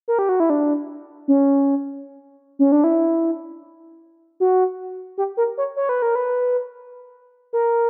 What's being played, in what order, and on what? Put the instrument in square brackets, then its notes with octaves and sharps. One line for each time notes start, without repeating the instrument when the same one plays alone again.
[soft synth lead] A#4
G4
F#4
E4
D4
C#4
C#4
D4
E4
F#4
G4
A#4
C#5
C#5
B4
A#4
B4
A#4